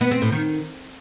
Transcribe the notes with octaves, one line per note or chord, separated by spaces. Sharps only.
B3
C4
A2
D#3